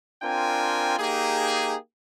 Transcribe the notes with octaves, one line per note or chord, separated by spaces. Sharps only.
C4 D4 F4 A#4 G5 G#5
A#3 D#4 G4 G#4